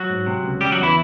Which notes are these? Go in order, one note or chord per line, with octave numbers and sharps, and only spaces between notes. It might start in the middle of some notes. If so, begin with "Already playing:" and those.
Already playing: F#3 F#4
G#2
C3
C#2
C#3 G3 G4
F#3 F#4
E2
E3 E4